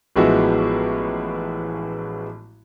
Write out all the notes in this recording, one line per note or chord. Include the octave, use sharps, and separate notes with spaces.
A1 F3 G#3 B3 E4 F#4